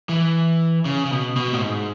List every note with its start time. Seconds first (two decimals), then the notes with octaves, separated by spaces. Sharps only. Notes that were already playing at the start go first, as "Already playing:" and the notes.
0.09 E3
0.85 C#3
1.06 C#3
1.11 B2
1.36 B2
1.53 A2
1.62 G#2